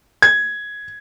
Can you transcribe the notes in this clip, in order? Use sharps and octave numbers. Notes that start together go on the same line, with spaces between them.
G#6